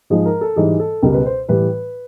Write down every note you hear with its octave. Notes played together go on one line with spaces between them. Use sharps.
G#2 F3 G#3 G#4
A#4
A4
G#2 E3 G3 G#4
A4
C#2 B2 G3 A#4
B4
C5
A2 E3 G3 B4